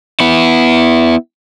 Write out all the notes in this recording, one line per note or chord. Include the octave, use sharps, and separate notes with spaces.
B3 E4